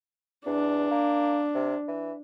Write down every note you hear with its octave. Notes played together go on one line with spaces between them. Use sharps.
E2 D4
A#3
C3
E3